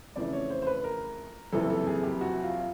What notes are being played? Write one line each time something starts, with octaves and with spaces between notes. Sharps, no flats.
F2 C#3 E3 A3 D5
C#5
C5
C5
B4
A#4
F#1 F2 C3 E3 A4
A4
G#4
G4
F#4
F4